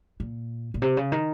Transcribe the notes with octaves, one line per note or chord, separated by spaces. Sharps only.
A#2
A#2
C3
C#3
D#3